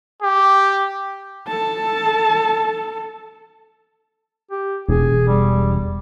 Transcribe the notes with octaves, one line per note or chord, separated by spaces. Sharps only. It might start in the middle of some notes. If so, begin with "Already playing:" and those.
G4
A4 A5
G4
E1 G#4
G3